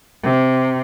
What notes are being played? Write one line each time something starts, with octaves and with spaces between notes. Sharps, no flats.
C3